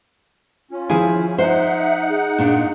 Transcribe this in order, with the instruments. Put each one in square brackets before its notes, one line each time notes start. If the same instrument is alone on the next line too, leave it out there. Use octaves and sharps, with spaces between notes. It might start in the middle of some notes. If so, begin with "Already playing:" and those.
[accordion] C#4 [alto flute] F4
[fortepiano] F3 G#4 G#5 [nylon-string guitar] E4
[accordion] D#4 F#5 [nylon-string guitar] C5 [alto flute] E5
[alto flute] G#4
[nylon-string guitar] A#2 D4